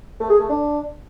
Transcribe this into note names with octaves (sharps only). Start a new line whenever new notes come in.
A3
G#4
A3
D4